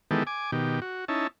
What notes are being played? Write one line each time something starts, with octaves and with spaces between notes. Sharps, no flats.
D#3 E3 G#3 B3 G4 A4
G#5 D6
B2 D#3 G4
F#4
C#4 D#4 E4 A5